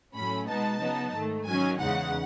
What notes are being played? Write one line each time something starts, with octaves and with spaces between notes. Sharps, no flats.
A2 F#3 A3 C#4 B5
B2 G#3 B3 D#4 A5
C#3 F#3 B3 D#4
G#2 D#3 A3
D#3 F#3 C#4 G#5
E2 C#3 E3 G#3 D#4 F#5